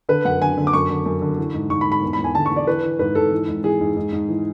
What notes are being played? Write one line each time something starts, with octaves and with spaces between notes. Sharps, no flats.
D3 B4
F#2 F#5
D3 G#5
D3
D6
F#2 C#6
D3
F#2
D3
E3
G#2
G#2 C#6
B5
G#2
B5
E2
B5
E2
G#5
D3 A5
C#6
E2
D5
E3 B4
E3
G#2 B4
G#2 A4
E3
G#2
E3 G#4
G#2
G#2
G#2
E3